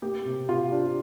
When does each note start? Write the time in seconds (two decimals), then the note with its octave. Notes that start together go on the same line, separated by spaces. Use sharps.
0.02 A#3 G4
0.25 C3
0.49 C3 F4
0.72 D4